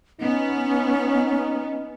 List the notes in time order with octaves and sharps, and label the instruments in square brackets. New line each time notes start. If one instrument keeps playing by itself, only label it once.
[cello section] B3 [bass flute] C#4 [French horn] D#4